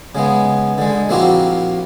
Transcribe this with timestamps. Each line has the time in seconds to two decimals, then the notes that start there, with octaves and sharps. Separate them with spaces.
0.15 C#3 G#3 B3
0.78 D3 G#3
1.09 A#1 A#3 C4 E4 F#4 G4